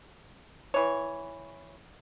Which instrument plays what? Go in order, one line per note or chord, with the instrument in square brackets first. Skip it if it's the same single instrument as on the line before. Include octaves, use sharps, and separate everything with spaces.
[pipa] E3 C#5